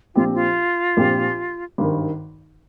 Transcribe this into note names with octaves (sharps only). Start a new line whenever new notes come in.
A#1 A#2 F3 C4 F4 G4
F4
A#1 A#2 F3 C4 G4
G#1 G2 D#3